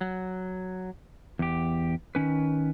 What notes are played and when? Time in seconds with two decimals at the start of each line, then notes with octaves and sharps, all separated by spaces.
0.01 F#3
1.39 E2 G4
2.15 D#3 C#4 B4